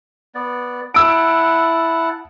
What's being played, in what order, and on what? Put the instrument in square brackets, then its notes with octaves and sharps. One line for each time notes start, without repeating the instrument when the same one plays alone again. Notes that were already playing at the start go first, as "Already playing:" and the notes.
[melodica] B3 D5
[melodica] E4 F#5 A5 [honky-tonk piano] E6 D7